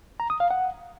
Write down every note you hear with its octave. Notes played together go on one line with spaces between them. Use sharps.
A#5
D#6
F5
F#5